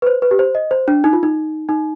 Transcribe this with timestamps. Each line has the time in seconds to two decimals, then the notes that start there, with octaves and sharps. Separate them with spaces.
0.02 B4
0.07 C5
0.22 B4
0.31 G4
0.39 C5
0.55 D#5
0.71 C5
0.88 D4
1.04 D#4
1.13 F4
1.23 D#4
1.69 D#4